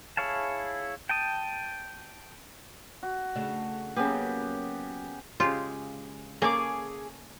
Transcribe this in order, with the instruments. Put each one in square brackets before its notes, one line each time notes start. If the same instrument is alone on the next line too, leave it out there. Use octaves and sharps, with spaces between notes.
[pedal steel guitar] E4 G#4 C#5 F5 A5
G5 A5 D#6
[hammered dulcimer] F#4
[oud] C#3 A3 D4
[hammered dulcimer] C#3 B3 G4 [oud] F#3 A#3 B4
[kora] C#3 G#3 G4 [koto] F4
[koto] A#3 [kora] C#4 A4 [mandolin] G#4 D6